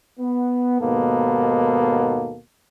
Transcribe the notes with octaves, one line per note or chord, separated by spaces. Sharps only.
B3
D#2 G#2 B2 A#3 B3 A4